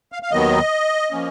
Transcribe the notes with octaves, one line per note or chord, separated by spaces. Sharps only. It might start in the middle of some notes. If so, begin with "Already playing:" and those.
F5
F5
D#2 D#3 F#3 B3 D#5
F3 A#3 C#4